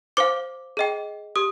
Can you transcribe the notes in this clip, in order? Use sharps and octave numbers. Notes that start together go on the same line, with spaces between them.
C5 F5 D6
G#4 D#5 G5
G4 D#6